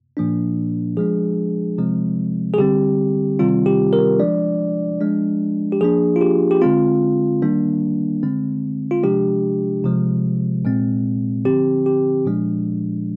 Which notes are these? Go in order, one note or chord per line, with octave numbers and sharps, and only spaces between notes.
A#2 F3 A#3 D4
F3 G#3 D4 G#4
C3 F3 G#3 C4
G#4
D3 G3 C4 G4
C3 D#3 G3 C4 F4
G4
A#4
F3 G#3 D4 D5
F3 G#3 D4
G4
F3 A#3 D4 G#4
F4
G4
G4
D3 G#3 C4 F4
D#3 G3 A#3 D4
D3 G#3 C4
F4
C3 F3 G#3 D4 G4
C3 F3 G#3
A#2 G#3 C4
D3 F3 C4 G4
G4
A#2 F3 G#3 D4